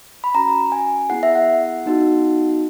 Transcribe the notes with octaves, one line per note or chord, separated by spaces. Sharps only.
B5
C#4 F#4 A#5
G#5
B3 E4 G#4 F#5
E5
F#5
B3 D#4 F#4